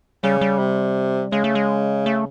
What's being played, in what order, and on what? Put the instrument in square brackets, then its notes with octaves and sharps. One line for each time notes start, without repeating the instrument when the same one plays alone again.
[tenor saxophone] C#3 [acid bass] G3
[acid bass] G3
[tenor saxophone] C3
[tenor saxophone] C#3 [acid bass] G#3
[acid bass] A3
G#3
A3